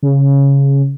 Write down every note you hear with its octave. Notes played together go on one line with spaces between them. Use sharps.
C#3